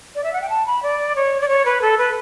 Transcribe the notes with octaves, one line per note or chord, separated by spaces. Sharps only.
D5
E5
F#5
G5
A5
B5
D5
C#5
D5
C#5
B4
A4
B4